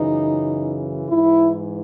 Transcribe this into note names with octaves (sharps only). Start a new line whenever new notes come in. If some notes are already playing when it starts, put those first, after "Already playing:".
Already playing: F#2 C#3 E3 D#4
G#2 E3 E4